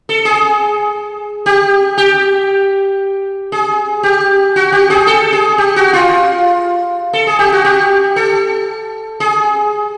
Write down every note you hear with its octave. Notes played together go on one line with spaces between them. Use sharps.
A4
G#4
G4
G4
G#4
G4
F#4
G4
G#4
A4
G#4
G4
F#4
F4
A4
G#4
G4
F#4
G4
A4
G#4